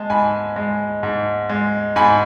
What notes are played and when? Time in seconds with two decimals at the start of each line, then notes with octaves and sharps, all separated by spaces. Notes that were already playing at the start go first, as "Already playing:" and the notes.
Already playing: G#3 A5
0.10 G#2 G#5 B5
0.56 G#3
1.03 G#2
1.49 G#3
1.96 G#2 G#5 B5